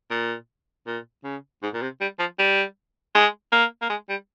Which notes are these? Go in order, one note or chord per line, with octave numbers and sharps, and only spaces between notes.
A#2
A#2
C#3
G#2
A#2
C3
G3
F3
G3
G#3
A#3
A#3
G#3
G3